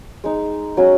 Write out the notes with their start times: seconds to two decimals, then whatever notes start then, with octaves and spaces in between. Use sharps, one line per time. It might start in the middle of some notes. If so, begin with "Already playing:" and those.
0.24 G#3 D#4
0.77 F#3 C#4